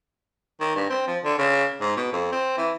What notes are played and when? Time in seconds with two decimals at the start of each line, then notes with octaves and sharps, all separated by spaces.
0.60 D#3
0.75 G2
0.90 C4
1.07 F3
1.24 D3
1.38 C#3
1.80 G#2
1.97 B2
2.12 F2
2.32 C4
2.57 E3